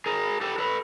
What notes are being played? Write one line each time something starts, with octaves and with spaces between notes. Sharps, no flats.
G#4 A#4
G4 A4
A4 B4